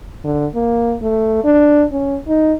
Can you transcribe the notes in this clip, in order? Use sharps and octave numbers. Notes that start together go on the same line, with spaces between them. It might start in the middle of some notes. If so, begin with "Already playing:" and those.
D3
A#3
A3
D4
C#4
D#4